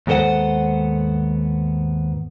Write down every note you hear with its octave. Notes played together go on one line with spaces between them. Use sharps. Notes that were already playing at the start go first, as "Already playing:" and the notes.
D#2 G#2 B3 A4 C5 F#5